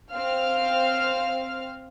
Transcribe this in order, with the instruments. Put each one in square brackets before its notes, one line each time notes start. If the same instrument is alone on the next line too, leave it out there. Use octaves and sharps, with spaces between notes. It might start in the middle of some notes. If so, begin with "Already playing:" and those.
[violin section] C4 F5 F6